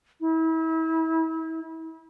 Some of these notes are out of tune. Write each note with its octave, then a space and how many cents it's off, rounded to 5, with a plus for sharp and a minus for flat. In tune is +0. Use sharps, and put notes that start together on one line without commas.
E4 -35